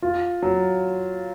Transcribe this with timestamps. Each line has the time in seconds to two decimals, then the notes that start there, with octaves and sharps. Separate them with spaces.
0.02 F4
0.42 F#3